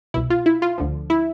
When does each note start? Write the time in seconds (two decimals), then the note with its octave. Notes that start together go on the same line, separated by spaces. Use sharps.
0.14 C2 B2 E4
0.30 F4
0.46 E4
0.62 F4
0.78 D2 D3 F3
1.10 E4